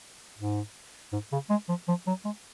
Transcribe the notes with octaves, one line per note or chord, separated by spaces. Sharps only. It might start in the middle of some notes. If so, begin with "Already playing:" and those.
G#2
G#2
C#3
G#3
F3
F3
F#3
G#3